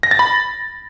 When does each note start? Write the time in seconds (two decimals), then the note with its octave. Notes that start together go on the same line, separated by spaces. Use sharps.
0.03 A#6
0.11 A6
0.19 B5